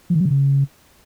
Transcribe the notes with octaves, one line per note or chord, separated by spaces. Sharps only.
F3
D#3
F#3
D3
C#3